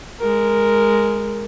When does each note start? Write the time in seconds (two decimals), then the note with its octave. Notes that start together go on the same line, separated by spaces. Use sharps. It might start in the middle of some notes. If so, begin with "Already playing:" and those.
0.19 G#3 A#4